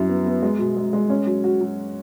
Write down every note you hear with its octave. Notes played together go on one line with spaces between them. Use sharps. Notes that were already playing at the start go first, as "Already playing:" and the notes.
Already playing: F#2 E4
B3
B3
G#3
B2
G#3
G#3
C#4
F#3
F#4
F#3